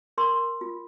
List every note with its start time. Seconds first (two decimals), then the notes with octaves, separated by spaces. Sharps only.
0.18 A#4 C6
0.61 F4